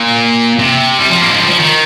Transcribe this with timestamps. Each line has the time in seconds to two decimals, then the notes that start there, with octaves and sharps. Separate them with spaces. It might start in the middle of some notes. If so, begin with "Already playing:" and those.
Already playing: A#2
0.59 C3
0.99 G3
1.09 F3
1.21 A#3
1.31 G#3
1.40 G3
1.50 F3
1.59 D#3